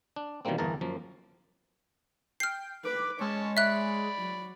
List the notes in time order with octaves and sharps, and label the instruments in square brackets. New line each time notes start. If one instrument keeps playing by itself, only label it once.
[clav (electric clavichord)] D4
B2 D#3 E3 G3 A#3 C4
G1 E2 E3 G#4 A#4 A5
F#2 F3 A#3
[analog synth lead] G5 [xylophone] F6 C7
[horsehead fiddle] B4 [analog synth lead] D6
[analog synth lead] G#3 [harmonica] C#4 A5 [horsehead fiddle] C#5
[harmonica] D5 B5 [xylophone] E5 F#6
[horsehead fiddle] F#3